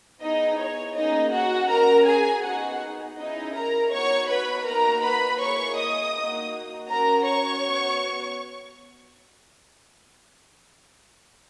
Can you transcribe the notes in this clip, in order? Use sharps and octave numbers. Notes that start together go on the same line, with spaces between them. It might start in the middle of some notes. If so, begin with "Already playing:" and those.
B3 D#4 E4 G#4 D#5
C#5
A#3 C#4 D#4 G#4 D#5
F#4 F#5
C#4 F#4 A#4 A#5
G#4 G#5
B3 D#4 F#4 G#4 F#5
C#4 D#4 E4 G#4 D#5
A#4 A#5
B3 D#4 F#4 C#5 C#6
B4 B5
A#3 D#4 F#4 A#4 A#5
B4 B5
A#3 E4 G#4 C#5 C#6
D#5 D#6
A#3 D#4 F#4
C#4 F#4 A#4 A#5
C#5 C#6
B3 F#4